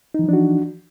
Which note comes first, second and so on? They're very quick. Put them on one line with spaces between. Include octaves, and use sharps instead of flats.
D#4 E3 F3 D4 F#4